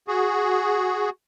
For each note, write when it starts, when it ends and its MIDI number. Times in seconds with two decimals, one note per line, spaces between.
0.08 1.10 66
0.08 1.10 68